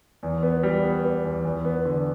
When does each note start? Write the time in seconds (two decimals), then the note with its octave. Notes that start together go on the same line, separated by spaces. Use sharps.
0.23 E2
0.43 B3
0.63 G3
0.83 B3
1.04 B3
1.24 E2
1.45 E2
1.65 B3
1.85 D3